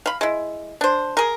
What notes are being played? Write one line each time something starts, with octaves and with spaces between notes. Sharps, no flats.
F5 B5
G#3 E4
D4 C5
G#4 A#4